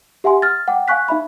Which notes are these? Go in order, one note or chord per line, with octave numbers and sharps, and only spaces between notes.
G4 E5 F#5 G#5 C6
F6 A6
F#5 G5 D6
F5 G#5 C#6 F#6 B6
D#4 E5 B5